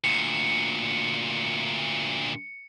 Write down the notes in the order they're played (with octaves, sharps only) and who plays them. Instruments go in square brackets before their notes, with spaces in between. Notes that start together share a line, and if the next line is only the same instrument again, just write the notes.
[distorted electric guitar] D2 A#2 [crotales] C#7